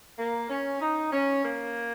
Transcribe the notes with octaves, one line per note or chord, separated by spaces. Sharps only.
A#3
C#4
D#4
C#4
A#3